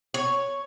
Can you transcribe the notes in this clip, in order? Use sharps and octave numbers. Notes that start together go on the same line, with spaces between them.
C#5